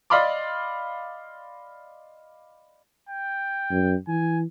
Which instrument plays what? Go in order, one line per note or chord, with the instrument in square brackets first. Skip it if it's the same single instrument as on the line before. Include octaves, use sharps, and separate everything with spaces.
[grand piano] D5 D#5 F5 B5 C6 D6
[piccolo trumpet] G5
[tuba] F#2
[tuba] E3 [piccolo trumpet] G#5